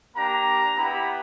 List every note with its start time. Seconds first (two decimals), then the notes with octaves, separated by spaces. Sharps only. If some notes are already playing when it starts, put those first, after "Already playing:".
0.15 A#3 D4 G4 A#5
0.77 B3 E4 G4 B5